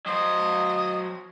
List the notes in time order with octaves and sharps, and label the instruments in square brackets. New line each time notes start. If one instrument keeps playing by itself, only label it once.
[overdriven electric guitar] F#3 C5 [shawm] D#5